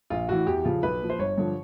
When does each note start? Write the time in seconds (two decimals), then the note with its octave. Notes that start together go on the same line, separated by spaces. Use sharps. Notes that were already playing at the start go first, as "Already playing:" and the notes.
0.10 A#1 F4
0.29 A2 E3 F#4
0.47 E2 G4
0.65 C#3 F3 F4
0.83 B1 B4
1.01 A#2 F3
1.10 C5
1.19 G1 C#5
1.38 G2 D3 F3